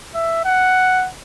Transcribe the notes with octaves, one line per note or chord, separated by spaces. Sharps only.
E5
F#5